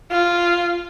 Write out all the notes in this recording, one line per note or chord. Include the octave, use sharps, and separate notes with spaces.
F4